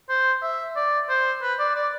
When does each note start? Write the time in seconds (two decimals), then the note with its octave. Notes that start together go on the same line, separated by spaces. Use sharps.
0.09 C5
0.43 E5
0.76 D5
1.09 C5
1.43 B4
1.59 D5
1.76 D5